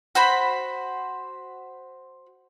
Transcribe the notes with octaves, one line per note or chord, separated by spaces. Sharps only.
F#4 C5 B5